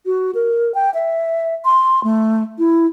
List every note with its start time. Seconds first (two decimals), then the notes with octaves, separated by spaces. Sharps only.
0.06 F#4
0.35 A#4
0.74 G5
0.94 E5
1.65 C6
2.04 A3
2.58 E4